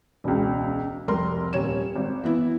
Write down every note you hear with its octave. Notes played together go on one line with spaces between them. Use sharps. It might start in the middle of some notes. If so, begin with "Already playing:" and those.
E1 C#2
F1 C2 A#4 C6
D#1 C#5 E7
G#1
E3 B3 E4